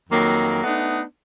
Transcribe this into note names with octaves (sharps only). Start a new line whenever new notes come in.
F2 D#3 F#3 A#3
A3 B3 D4 D#4